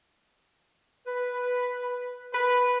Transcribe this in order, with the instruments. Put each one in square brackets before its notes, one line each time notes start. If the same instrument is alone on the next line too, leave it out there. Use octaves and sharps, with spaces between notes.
[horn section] B4
B4